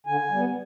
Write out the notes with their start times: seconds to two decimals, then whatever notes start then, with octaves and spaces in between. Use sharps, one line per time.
0.07 D3 G#5
0.31 G3 B3